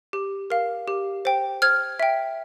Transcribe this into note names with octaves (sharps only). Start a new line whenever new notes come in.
G4
A#4 F5
G4
C5 G5
C5 F6 G#6
E5 G5